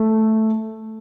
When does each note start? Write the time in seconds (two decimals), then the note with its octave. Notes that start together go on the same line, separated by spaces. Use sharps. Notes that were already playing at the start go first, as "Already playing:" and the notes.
Already playing: A3